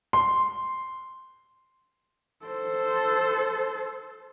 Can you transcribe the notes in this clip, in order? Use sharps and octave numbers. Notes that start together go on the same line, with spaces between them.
C6
A4 C5